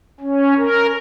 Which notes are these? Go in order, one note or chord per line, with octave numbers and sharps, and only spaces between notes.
C#4
A#4